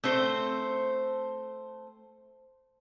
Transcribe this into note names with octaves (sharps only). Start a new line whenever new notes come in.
A3 C4 C5